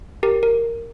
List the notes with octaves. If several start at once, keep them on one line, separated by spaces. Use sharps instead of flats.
G4 A#4
A#4